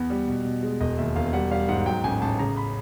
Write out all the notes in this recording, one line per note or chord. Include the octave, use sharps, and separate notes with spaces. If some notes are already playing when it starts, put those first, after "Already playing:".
Already playing: E2 B3
G3
B2
B2
G#3
E1 D#5
D#2 E5
E1 F5
G3 F#5
G3 F5
G#2 F#5
F#3 G5
A1 G#5
A1 A5
C#3 A#5
B5